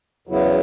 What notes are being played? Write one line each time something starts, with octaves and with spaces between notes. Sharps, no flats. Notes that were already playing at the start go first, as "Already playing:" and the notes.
E2 C#3 F#3 B3 E4